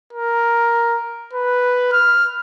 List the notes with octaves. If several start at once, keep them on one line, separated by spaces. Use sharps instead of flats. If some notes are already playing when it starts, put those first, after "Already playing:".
A#4
B4
F6